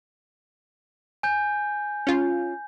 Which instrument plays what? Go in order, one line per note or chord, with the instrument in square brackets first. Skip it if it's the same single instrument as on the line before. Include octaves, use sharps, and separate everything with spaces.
[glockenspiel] G#5 G6
[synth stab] C#4 F4